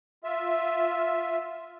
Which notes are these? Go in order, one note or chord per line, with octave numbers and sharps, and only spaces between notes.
F4 E5